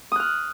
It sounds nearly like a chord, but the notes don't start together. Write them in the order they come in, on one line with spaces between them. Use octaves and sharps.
D#6 F#6 F6